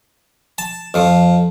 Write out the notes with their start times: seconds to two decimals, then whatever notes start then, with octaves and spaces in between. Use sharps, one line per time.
0.58 A5
0.94 F2 F3